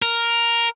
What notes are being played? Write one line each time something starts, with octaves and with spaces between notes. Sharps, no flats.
A#4